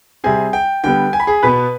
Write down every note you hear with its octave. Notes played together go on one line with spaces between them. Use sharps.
C3 G3 C4 G#4 G#5
G5
D3 G3 B3 G5
G#5
B5
G#4 G#5
B2 B3 B4 B5